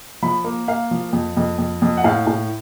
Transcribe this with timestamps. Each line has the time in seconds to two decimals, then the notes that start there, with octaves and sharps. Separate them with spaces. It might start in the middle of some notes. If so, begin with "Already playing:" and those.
0.22 F3 B5
0.44 A#3
0.68 A#3 F5
0.91 F3
1.13 F2
1.37 F2
1.58 F2
1.82 F2
1.97 F#5
2.04 A2 F5
2.27 A2